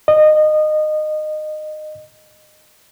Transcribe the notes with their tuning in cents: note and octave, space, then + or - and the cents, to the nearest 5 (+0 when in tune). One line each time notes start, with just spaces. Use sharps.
D#5 -20